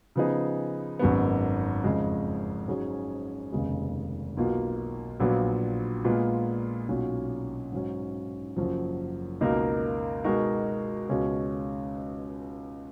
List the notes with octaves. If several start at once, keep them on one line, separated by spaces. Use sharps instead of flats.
C#3 F3 B3 D#4 G#4
G#1 F#2 D#3 G#3 B3
F2 C#3 G#3
G#2 F#3 C#4 G#4
F1 D#2 C#3 G#3 B3
B1 B2 A#3 F4
A#1 A#2 F#3 B3
A#2 G#3 B3 F4
B1 A#2 F#3 C#4
G#2 F#3 C#4
F#1 F#2 F3
C#2 B2 A#3 D#4 A#4
B2 G#3 D#4 F#4 A#4
C#2 B2 G#3 C#4